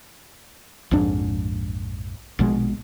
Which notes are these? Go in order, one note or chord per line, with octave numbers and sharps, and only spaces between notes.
A#1 F2 G#2 D4
A#1 B2 G#3